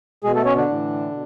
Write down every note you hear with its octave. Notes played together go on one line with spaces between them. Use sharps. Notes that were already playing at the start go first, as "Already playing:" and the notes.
B2 G#3 G#4
A3 A4
C#4 C#5
D3 D4
A2 E3
B2